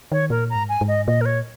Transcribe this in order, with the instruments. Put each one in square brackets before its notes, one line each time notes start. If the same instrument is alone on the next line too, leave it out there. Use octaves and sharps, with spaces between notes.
[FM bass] D#3 [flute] C#5
[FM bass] A#2 [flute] A#4
[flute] A#5
[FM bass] G#2
[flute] G#5
[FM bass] G#2
[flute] D#5
[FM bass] A#2 [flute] D#5
[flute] A#4
C#5